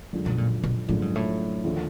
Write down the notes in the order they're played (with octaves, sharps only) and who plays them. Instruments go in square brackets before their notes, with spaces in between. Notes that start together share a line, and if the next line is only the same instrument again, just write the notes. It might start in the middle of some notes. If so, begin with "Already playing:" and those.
[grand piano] F#2 D3 F3 G#3
[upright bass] B2
A#2
B2
[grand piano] F#2 D3 F3 G#3 [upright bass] A2
[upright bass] G#2
A2
[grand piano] D#2 D3 F3 A3